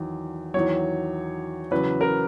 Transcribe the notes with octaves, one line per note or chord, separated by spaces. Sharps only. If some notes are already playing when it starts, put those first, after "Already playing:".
Already playing: E2 D#3 F#3
E2 D#3 F#3 C#5
E2 C#3 F#3 B4
A#4